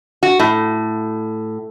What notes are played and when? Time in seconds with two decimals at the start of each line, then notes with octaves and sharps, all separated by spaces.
0.23 F#4
0.39 A2